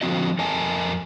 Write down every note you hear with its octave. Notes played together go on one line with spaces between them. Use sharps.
D3 F3 C4 F#4 D#5
F2 A4 A#4 D#5 G#5 A5